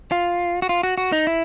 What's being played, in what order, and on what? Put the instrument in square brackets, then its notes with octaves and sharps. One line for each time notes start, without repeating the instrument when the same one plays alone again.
[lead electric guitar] F4
F#4
F4
F#4
F#4
D#4
E4